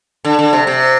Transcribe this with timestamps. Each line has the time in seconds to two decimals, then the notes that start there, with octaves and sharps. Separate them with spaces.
0.25 D3
0.39 D3
0.53 C3
0.67 C3